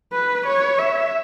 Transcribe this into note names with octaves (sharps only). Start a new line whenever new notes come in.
B4
C#5
E5